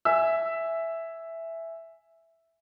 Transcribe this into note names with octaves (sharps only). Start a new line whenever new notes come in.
E5 G#5 E6